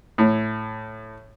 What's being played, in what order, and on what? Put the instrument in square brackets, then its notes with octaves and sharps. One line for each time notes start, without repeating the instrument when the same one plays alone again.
[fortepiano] A2